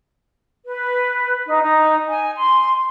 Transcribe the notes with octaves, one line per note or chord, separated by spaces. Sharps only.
B4
D#4
D#4
G#5
C6